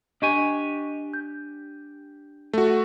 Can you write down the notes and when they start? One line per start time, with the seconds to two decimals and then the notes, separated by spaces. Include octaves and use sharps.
0.22 D4 G4 D#5 G#5 C#6 D#7
1.14 G6
2.54 A3 F#4